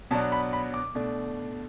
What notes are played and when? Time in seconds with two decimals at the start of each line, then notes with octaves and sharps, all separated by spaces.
0.11 B2 F#3 B3 D4 A5
0.32 B5
0.53 B5
0.74 D6
0.95 B2 A3 D4